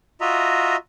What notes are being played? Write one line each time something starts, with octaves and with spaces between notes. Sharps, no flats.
F4 F#4 D#5 E5 A#5